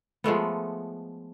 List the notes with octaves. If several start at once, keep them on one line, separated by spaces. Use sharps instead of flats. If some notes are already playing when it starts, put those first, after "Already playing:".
F3 G#3 A3 B3